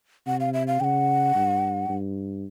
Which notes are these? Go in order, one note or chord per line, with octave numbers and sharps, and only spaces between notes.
C3 F#5
F5
E5
F5
C#3 F#5 G5
G2
G2